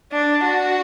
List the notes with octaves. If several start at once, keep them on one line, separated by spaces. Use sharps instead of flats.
D4
F#4